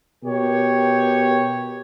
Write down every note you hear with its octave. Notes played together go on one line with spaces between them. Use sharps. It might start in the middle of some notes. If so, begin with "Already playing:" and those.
B2 G4 A#4 C#5